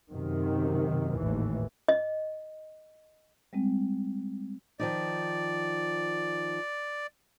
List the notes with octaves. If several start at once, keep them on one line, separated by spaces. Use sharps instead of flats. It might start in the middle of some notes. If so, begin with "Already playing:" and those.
F#2 C3 D#3
G#1 D#2 A2 E3
D#5
G3 G#3 C4
D#3 F3 D#4 D5